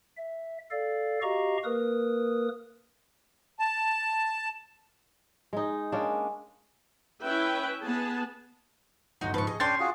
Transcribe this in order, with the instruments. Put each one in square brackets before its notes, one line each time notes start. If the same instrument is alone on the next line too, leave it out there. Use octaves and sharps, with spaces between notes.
[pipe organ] E5
A4 D5 F5
F#4 G4 D#5 F5 A#5 C#6
A#3 A#4 B4 D#6
[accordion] A5
[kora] G#3 D#4
G#3 A#3 C#4 D4
[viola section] C#4 E4 B4 E5 G5
B3 G#4 A5
[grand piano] G1 F#3 [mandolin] D#4 F#4 D#5
[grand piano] G#2 C#3 F3 [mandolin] B4 C#6
[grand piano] G#4 [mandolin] D#5
[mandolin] C#4 C#5 C6 [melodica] D4 G5 [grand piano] A6
[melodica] F4 F#4 G#4